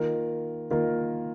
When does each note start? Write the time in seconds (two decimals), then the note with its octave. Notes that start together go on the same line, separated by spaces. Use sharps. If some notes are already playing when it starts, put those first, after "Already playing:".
Already playing: D#3 A#3 F4 A#4
0.71 D#3 A#3 F4 A#4